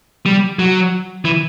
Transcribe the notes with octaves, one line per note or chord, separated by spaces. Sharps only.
G3
F#3
E3